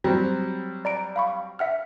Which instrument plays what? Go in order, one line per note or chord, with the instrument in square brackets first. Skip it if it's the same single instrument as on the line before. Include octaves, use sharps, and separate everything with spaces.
[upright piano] F#3 G3 C4
[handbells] D5 A#5 D7
F5 B5 C#6
E5 F#5 F6